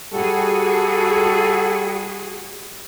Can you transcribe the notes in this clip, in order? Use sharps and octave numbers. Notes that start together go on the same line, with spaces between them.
G3 F#4 G#4 A4